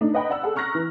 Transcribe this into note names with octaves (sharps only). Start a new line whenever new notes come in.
A3 D4 D#4
B4 D#5 F#5 G5 A#5 B5
D5 F#5 B5 E6
G#4 A4 F#5
A#5 C#6 F6 F#6 A#6
E3